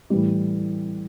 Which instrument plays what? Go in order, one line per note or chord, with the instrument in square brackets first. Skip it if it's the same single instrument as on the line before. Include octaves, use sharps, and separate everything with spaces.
[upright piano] A2 E3 G3